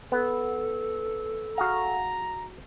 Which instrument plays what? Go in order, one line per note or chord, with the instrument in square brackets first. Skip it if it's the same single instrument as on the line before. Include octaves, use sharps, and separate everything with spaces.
[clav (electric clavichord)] B3 [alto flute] A4
[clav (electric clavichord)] F#4 G#4 F5 [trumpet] A#5